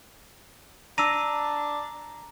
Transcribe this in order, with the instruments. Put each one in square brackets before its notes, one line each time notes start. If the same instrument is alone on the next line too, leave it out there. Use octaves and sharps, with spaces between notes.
[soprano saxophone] D4 [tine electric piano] A#5 [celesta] E6 D#7